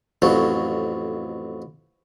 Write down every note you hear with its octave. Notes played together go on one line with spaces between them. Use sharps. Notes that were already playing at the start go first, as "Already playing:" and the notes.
A1 F2 F#3